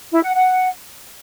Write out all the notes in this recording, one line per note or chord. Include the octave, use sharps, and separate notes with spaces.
E4
F#5
F#5